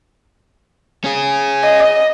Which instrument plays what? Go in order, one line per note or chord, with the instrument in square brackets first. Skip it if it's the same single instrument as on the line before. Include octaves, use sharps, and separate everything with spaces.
[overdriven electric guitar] C#4 G#4
[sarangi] D#5